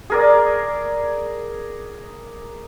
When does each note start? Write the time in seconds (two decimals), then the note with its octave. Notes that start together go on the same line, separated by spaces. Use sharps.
0.10 G#4 A#4 D5